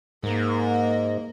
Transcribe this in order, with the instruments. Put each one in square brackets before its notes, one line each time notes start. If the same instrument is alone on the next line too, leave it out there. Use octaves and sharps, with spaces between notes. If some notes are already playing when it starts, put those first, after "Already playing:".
[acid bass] G#2 [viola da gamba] A#3 A#4